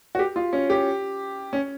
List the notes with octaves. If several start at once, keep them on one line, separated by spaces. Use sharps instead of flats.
F#4
G4
F4
C#4
G4
C#4